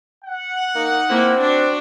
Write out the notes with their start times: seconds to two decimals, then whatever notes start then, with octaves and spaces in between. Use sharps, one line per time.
0.25 F#5
0.75 A#3 D#4
1.10 A#3 C4 E4
1.40 D4 F#4